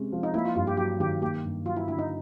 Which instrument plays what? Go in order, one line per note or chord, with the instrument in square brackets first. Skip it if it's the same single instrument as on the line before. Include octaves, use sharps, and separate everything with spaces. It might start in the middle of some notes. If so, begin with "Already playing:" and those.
Already playing: [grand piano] C3 G#3 C#4
F3
[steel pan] D#4
[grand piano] A#3 [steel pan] E4
[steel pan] F4
[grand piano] G2 [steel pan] F4
[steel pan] G4
[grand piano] F#3 [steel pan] G4
[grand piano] D#3 [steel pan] G4
[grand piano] A#3 [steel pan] G4
[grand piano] G2
[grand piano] F#3 [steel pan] F4
[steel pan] E4
[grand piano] D3 [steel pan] E4
[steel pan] D#4